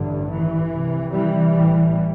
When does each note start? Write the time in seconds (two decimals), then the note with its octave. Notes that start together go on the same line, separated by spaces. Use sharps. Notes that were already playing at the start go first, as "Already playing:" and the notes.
Already playing: A1 G2 D3
0.30 E3
0.72 C2 C3
1.13 E3 G3
1.55 A1 A2